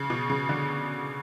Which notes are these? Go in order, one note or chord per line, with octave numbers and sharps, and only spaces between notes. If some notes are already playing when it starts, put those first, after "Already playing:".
Already playing: C#3
B2
C#3
D3